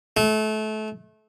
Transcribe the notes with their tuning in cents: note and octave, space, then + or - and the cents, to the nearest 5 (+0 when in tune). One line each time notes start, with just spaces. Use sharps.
A3 -30